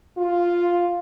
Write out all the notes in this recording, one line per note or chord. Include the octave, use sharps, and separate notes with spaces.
F4